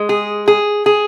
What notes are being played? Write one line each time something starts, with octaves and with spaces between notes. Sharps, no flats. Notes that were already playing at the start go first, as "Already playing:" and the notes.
Already playing: G#3
G#4
G#4
G#4